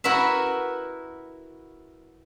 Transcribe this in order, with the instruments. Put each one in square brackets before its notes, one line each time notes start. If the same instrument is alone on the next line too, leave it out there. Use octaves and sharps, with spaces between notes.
[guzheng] E4 F#4 A#4 B4 E5